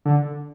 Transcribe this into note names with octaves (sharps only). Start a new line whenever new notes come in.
D3